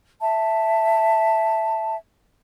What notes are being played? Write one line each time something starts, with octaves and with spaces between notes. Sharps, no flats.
E5 A5